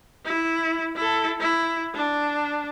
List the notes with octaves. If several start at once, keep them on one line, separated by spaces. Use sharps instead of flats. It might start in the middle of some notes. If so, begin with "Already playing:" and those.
E4
E4 A4
E4
D4